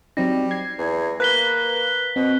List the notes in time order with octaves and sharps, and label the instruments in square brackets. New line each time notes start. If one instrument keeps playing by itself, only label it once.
[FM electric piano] F#3 C4 D#4 [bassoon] G3 [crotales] A#6
[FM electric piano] G#6 C7
[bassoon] E2
[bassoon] A#3 [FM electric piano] B4 F5 [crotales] F#6 B6 G7
[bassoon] B2 [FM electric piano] C4